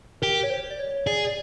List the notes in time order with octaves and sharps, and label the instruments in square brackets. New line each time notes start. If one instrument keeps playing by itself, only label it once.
[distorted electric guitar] G4 [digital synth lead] A#4
[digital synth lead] C#5
C5
D5
C#5
[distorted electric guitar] G#4 [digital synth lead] D5
[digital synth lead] D5